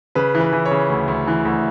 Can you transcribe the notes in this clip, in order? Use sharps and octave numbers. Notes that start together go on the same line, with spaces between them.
C#3 B4
E3
B4
E3
C#5
C#3
D2
D2
E3
D2